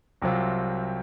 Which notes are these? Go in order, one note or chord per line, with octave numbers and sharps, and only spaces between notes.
C2 C3 F#3 C4 F4